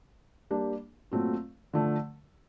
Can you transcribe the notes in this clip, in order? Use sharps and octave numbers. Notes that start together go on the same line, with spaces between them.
G3 A#3 D4 G4
A#2 F#3 A3 C4 F4
D3 F3 A3